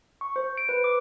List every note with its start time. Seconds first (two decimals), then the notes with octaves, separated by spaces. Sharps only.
0.21 C#6
0.36 C5
0.58 D7
0.69 B4
0.84 D6